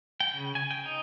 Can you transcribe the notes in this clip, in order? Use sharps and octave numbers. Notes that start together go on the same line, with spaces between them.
G5
C#3
G#5
G5
D#4